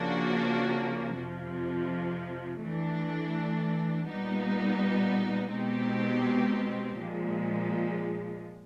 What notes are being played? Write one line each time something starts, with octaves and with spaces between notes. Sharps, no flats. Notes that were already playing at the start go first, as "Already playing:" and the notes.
Already playing: C#3 F3 A#3 D4 F#4
F2 C3 F3
E3 A3 D4
A#2 G3 B3 D#4
B2 G#3 C4 D#4 G4
A#2 F3 G#3